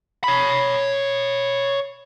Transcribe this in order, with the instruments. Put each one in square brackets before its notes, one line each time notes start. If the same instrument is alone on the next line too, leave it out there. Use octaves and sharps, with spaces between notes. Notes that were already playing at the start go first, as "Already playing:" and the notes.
[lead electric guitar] C#5 B5